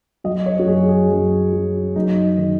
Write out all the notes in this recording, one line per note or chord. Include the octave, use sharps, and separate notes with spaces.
F#3 D#5
C#5
F#4
F#2 G#4
G#4
F#2
F#3
F#2 D#4
D#3